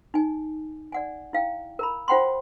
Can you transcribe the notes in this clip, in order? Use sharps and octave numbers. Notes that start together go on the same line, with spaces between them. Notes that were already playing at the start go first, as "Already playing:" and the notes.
D#4 G#5
D5 F#5 G#5
E4 F5 G5
A#4 A#5 B5
F4 C5 F#5 G5 B5 C6